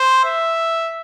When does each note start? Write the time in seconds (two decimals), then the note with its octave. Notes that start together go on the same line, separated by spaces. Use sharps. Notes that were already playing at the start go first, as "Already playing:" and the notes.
Already playing: C5
0.24 E5